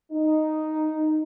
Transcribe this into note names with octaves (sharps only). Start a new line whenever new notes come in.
D#4